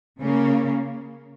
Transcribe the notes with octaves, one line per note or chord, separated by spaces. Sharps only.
C#3 A#3 C#4